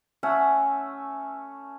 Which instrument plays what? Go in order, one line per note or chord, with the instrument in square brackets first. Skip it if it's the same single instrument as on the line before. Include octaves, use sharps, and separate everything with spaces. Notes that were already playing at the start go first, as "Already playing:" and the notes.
[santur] A3 C#4 E5 F#5